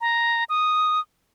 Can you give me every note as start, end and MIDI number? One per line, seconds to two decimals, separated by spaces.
0.01 0.44 82
0.49 1.00 87